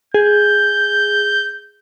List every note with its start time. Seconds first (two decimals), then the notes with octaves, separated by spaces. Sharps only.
0.14 G#4 G6